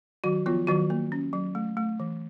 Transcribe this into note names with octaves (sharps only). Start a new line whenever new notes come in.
D#3 F#3 F#4
F3 B3 F4
D#3 F#3 F#4
A#3
C#4
F#3
A3
A3
E3